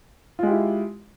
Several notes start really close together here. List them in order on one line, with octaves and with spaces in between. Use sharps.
F4 G#3 G4 E4